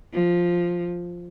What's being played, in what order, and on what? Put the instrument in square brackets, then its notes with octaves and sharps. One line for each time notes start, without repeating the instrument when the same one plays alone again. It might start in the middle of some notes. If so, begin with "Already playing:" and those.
[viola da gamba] F3